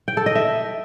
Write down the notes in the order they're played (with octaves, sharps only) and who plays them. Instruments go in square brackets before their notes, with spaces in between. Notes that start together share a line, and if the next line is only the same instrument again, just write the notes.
[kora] G5
A4
D#5
E5